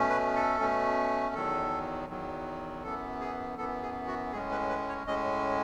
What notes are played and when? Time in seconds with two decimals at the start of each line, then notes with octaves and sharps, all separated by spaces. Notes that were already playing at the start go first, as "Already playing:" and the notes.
Already playing: B2 A3 C#4
0.10 B4
0.36 A4
0.60 B2 A3 C#4
1.35 E2 D#3 F#3 A4
2.09 E2 D#3 F#3
2.83 F#2 E3 B3 A4
3.21 G#4
3.58 F#2 E3 B3 A4
3.82 G#4
4.07 F#4
4.32 A2 G#3 C#4 G#4
4.51 B4
4.69 B4
4.89 C#5
5.07 A2 G#3 C#4 D#5